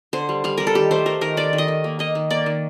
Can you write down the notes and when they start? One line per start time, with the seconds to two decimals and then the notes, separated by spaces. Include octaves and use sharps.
0.13 D3 C5
0.29 G3
0.44 G3 F5
0.57 G3 A#4
0.67 A4
0.75 D#3 G4
0.91 A3 C5
1.06 A3 A#4
1.21 D#3 A#4
1.37 D#3 D5
1.53 D#3
1.58 D#5
1.68 D#3
1.84 A#3
1.99 A#3 D#5
2.15 D#3
2.30 A#3 D5
2.46 D#3